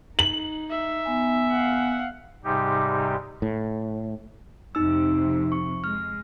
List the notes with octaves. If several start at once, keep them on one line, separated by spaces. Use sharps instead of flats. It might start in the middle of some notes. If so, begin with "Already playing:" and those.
D#4 F#7
E5
B3 G#5
F5 F#5
G#2 C3 G3 D#4 G4
A2
F2 C3 D#4 E6
C#6
G#3 F6